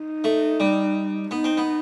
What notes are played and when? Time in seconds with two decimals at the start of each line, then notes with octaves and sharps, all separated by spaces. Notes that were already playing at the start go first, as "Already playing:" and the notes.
Already playing: D#4
0.24 A3
0.60 G3
1.31 B3 D#4
1.44 C4
1.57 B3